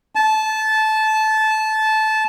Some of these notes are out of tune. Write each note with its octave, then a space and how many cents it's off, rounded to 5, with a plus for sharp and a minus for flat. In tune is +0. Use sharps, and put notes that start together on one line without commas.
A5 -15